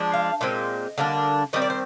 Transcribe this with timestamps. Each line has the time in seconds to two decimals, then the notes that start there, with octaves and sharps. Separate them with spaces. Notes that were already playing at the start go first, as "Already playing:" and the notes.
Already playing: F3 G#3 D4
0.14 F5
0.41 A#2 G#3 C4 D#5
0.98 D3 G3 A#3 D4
1.53 D#3 G3 C4 D#5
1.62 D5
1.70 C5